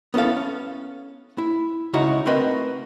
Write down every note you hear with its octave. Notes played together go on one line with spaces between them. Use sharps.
B3 C#4 E4 A4 F5
C#4
E4
C#2 C#3 D#4 E4 F#4 A#5
A3 C4 F#4 A#4 B4 D#5